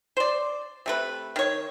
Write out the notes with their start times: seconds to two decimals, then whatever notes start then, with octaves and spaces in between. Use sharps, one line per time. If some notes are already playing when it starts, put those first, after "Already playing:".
0.17 C5 D5
0.86 C3 A3 B4
1.36 D#3 C#5